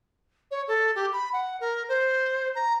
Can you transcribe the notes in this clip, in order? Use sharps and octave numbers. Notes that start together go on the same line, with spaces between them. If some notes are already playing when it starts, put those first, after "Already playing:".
C#5
A4
G4
B5
F#5
A#4
C5
A#5